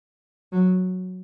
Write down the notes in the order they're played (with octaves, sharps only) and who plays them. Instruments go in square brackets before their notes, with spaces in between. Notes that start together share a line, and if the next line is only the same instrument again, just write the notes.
[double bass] F#3